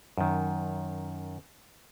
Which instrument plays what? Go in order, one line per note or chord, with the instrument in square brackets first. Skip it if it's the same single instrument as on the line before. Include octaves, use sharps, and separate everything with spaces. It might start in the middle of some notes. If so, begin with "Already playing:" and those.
[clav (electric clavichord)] F#2 D#3